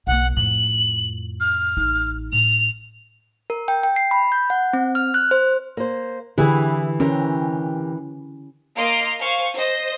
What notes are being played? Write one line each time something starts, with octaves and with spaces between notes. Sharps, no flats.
B1 A#3 F#5
F2 A2 F#7
F6
A1 D#4
A2 F7
A#4
G5
G5
C7
B5
G6
F#5
C4
F6
F#6
C5
A#3 C5
D3 E3 E4 G4 G#4
C3 C#4 G4 A#4
A#3 D#5 F5 C6 F6 D7
C5 F5 G#5 C#6
C5 D#5